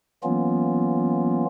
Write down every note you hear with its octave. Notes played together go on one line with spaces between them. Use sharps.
E3 F#3 A#3 B3 C#4 F4